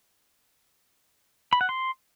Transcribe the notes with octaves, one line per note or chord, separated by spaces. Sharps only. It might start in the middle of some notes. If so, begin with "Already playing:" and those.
B5
F#5
C6